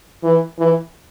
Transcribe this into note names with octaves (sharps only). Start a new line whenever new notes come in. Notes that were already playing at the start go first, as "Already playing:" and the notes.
E3
E3